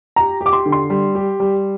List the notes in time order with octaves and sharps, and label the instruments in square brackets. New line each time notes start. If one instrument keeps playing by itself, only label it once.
[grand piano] G4 [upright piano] A#5
[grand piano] G4
[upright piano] D6
C6
[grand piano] D3
[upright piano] C6
[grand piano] G3
G4
G3